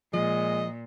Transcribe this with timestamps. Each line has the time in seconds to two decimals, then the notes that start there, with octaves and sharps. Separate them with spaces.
0.14 A#2 F3 G#3 D#5